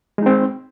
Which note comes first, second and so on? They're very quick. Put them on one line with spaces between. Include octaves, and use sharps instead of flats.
G#3 D#4 C4